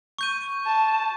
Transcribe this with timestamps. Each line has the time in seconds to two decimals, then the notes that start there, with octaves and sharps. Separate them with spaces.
0.19 C#6 G6 D#7
0.66 A5